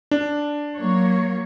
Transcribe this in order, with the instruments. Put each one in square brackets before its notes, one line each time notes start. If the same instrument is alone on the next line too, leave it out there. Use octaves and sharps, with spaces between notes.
[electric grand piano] D4
[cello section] F#3 A#3 C#5